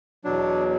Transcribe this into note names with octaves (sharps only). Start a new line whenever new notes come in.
E2 B2 F#3 D4